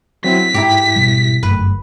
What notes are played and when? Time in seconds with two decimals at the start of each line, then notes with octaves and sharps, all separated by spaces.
0.24 F#3 C4 E4 B6
0.54 G#2 E4 G4 A#5
0.96 B2 G3
1.43 G1 F#2 A3 B4